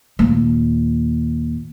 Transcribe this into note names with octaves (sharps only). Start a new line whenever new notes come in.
D#2 A#2